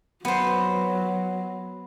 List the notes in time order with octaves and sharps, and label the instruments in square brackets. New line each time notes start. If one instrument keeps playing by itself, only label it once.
[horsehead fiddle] F#3 [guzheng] B3 C5